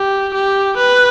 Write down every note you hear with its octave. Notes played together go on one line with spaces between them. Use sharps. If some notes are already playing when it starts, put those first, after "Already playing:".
Already playing: G4
G4
B4